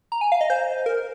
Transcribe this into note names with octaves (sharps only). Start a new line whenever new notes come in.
A#5
G#5
F5
D#5
C5
A#4